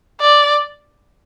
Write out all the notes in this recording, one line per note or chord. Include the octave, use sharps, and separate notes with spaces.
D5